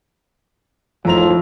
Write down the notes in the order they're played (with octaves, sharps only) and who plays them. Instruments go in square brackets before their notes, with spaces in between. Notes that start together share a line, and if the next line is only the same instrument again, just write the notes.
[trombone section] G#1 A2 F3 [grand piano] F2 A#5 F7